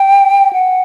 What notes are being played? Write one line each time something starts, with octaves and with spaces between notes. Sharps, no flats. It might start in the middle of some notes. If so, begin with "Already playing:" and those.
Already playing: G5
F#5